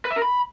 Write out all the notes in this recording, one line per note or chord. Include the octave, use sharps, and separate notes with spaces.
B4
E5
A#4
B5